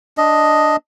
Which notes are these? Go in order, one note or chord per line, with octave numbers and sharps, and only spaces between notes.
D4 D#5